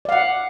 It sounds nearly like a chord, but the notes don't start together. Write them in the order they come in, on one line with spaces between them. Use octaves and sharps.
D5 F5 F#5